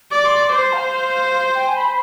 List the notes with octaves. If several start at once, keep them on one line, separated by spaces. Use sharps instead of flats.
D5 D6
C6
D6
C5 C6
F5
G5
G#5
B5